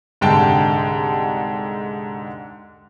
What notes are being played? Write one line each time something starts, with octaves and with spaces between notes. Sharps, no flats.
C2 G#2 D3 G5 A5